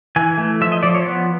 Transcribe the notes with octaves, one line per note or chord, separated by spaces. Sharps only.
E3 G#5
A3
F3 E5
D#5
F3 D5
C#5
B3